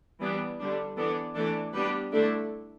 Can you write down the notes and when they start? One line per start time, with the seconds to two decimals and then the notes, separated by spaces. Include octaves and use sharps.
0.20 E3 G3 B3 D4
0.59 D3 G3 D4
0.97 E3 B3 D4 A4 D5
1.35 E3 A3 D4 A4 D5
1.74 G3 B3 D4 G4 B4
2.12 D3 A3 D4 E4 A4